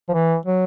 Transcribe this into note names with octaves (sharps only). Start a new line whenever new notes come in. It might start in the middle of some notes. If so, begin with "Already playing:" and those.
F3
E3
F#3